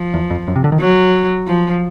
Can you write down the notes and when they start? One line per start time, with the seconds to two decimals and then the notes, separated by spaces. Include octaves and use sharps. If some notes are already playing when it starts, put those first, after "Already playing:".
Already playing: F3
0.14 E2
0.30 F2
0.48 F#2
0.56 C3
0.64 D3
0.72 D#3
0.80 F#3
1.47 F3